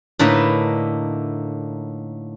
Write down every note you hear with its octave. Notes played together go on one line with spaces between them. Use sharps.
A2 D3 A#3 D#4 E4 B4